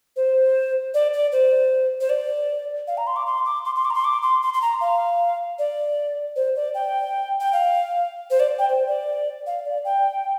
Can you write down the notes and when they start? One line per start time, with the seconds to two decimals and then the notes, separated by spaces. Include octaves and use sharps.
0.16 C5
0.94 D5
1.13 D5
1.32 C5
2.01 C5
2.10 D5
2.88 F5
2.98 A#5
3.07 C6
3.16 D6
3.26 C6
3.45 D6
3.65 C6
3.75 C6
3.85 D6
3.90 A#5
3.95 C6
4.04 D6
4.22 C6
4.42 C6
4.54 C6
4.62 A#5
4.81 F5
5.59 D5
6.36 C5
6.56 D5
6.75 G5
7.40 G5
7.53 F5
8.30 C5
8.40 D5
8.59 G5
8.69 C5
8.88 D5
9.47 F5
9.65 D5
9.85 G5